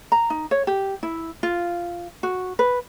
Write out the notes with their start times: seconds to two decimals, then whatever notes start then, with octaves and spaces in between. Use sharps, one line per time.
0.12 A#5
0.30 D#4
0.51 C#5
0.67 G4
1.03 E4
1.43 F4
2.23 F#4
2.59 B4